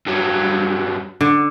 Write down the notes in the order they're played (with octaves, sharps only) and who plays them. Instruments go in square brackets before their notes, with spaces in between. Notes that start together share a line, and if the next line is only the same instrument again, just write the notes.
[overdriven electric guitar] G2 F#3
[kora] D3